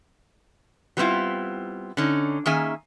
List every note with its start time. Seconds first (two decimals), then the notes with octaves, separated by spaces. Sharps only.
0.97 F#3 G3 B3 C4 E4 F4
1.97 D3 C#4 D#4
2.46 D#3 A#3 C#4 G#4 E5 G#5